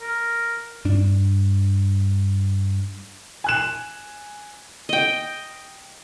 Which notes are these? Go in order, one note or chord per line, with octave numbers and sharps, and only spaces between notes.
A#4
G2 D4
G#5 F#6 E7
D#5 G5